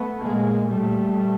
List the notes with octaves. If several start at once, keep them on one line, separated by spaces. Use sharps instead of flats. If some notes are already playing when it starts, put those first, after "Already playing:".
Already playing: A3 B3
A#2 G#3 A#3
A#2 G3 A3